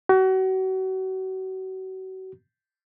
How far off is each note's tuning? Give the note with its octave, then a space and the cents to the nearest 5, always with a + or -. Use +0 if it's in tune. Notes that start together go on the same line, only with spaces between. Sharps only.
F#4 +35